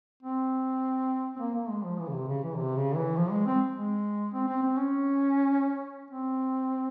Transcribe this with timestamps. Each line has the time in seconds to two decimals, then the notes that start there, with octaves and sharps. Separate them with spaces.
0.23 C4
1.36 C4
1.40 A#3
1.55 A#3
1.69 G#3
1.84 F3
1.99 E3
2.08 C#3
2.13 C3
2.28 C#3
2.43 E3
2.57 C3
2.77 C#3
2.96 E3
3.17 F3
3.31 G#3
3.46 C4
3.76 G#3
4.33 C4
4.48 C4
4.63 C4
4.77 C#4
6.10 C4